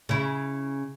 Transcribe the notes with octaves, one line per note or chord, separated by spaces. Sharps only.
C#3 E4